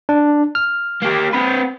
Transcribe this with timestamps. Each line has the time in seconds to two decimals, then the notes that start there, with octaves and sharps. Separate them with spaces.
0.09 D4
0.55 F6
1.02 A#3 G4
1.33 C4 B4